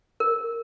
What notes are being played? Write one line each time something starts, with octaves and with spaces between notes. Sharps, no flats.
A#4